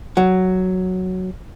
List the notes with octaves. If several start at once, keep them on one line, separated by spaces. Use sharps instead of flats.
F#3